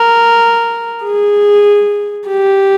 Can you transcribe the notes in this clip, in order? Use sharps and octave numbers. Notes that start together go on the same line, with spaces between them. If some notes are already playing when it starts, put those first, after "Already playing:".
Already playing: A#4
G#4
G4